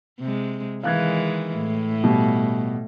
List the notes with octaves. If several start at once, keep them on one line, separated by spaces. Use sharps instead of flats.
C3 G#3
D#3 E3 G#3 F5 F#6 G#6
A2
B2 G3